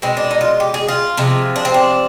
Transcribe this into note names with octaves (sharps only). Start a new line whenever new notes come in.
B2 G#3 C4
D4
D#4
F4
G4
G#4
F4
C3 F3 G#3
D4
C4
D4